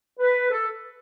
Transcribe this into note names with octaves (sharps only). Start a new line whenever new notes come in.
B4
A4